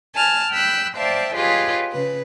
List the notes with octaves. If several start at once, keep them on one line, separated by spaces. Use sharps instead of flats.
G#5 A5 F6
G5 B5 E6 F#6 G6
C5 D5 E5 F5 G5 A5
F4 G4 G#4 B4 C#5 D#5
C#3 B4